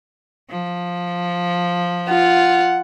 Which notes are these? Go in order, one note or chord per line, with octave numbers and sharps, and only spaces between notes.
F3
F4 F#5